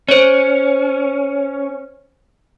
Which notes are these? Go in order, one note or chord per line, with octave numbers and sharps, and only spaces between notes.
C#4 C5 C#5